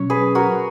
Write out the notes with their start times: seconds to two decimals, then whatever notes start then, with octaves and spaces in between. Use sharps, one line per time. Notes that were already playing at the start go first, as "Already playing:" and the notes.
Already playing: B2 F#3 C#4 C#5
0.10 G#4 B4
0.35 F#4 A#4